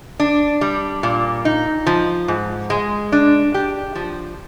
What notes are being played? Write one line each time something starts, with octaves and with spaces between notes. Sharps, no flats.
D4
G3
A#2
D#4
F3
G#2
G#3
D4
G4
F3